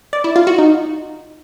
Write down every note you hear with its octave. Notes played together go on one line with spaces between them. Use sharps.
D5
E4
F4
F#4
D#4